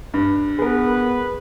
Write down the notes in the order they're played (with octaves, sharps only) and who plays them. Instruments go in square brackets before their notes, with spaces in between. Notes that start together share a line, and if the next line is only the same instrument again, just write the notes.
[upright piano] G2
[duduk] B3 [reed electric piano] G#4 A#4 [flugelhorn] B4